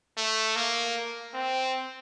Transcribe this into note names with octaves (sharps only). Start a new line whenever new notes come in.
A3
A#3
C4